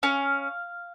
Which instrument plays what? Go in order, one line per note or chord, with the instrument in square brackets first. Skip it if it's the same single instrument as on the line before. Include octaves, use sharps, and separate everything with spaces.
[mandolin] C#4 F5